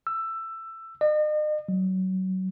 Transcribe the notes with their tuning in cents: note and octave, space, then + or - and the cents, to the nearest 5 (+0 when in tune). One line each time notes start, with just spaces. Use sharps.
E6 +15
D#5 -40
F#3 +20